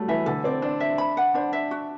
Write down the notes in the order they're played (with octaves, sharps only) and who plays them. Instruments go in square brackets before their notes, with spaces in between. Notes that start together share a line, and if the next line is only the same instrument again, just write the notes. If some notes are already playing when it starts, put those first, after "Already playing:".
Already playing: [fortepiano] F#3 G3 A3
[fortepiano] E3 [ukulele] E5
[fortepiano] D3 [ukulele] A4
[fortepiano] C4 [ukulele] D5
[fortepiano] D4 [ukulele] C5
[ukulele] E5
B5
F#5
[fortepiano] D4 [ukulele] C5
[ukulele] E5
F#4